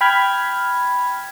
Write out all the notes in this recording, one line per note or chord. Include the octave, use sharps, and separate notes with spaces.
G5 B5 F6 G#6